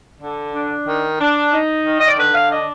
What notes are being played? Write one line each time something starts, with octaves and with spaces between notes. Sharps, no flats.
D3
D4
D#3
D4
D#4
D#3
D#5
D5
D3 B4
F5
D4 D#5